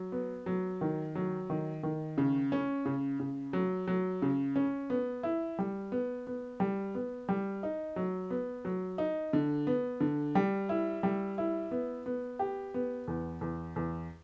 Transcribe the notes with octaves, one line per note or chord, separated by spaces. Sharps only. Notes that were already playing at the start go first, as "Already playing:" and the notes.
Already playing: F#3
B3
F#3
D#3
F#3
D#3
D#3
C#3
C#4
C#3
C#3
F#3
F#3
C#3
C#4
B3
E4
G3
B3
B3
G3
B3
G3
D#4
F#3
B3
F#3
D#4
D3
B3
D3
G3
E4
G3
E4
B3
B3
G4
B3
E2
E2
E2